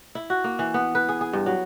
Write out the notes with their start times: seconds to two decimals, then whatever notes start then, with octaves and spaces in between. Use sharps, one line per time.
0.15 E4
0.30 F#4
0.44 A#3
0.59 E3
0.74 B3
0.95 B4
1.09 G#4
1.21 G#4
1.33 G2
1.46 F#3